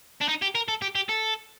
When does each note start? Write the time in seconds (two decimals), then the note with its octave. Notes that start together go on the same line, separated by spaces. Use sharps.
0.21 D4
0.29 D#4
0.42 G4
0.55 A#4
0.68 A4
0.82 G4
0.95 G4
1.09 A4